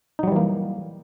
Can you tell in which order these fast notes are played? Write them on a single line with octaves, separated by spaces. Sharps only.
D#4 F#3 G3 E3 A#3